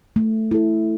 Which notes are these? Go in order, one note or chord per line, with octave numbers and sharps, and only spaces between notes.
A3
E4 A4